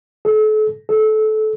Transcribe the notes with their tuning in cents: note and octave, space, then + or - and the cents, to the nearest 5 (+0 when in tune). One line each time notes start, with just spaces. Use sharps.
A4 -35
A4 -20